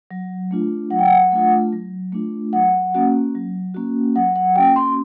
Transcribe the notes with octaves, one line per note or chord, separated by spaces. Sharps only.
F#3
A3 D4 F4
F#3 F#5
G5
F#5
A3 D4 F4
F#3
A3 D4 F4
F#3 F#5
A#3 C#4 F#4
F#3
A#3 C#4 F#4
F#3 F#5
F#5
A#3 C#4 F#4 G5
C6